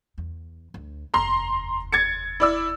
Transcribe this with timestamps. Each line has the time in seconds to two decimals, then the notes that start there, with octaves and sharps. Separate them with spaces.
0.18 E2
0.74 D2
1.14 F1 D#2 A#5 C6
1.92 G#6 A6 C#7
2.40 E4 D5 E6